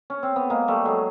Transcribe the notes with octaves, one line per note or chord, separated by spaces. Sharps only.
C#4
C4
B3
G#3 A#3
G3 A3
F#3 G#3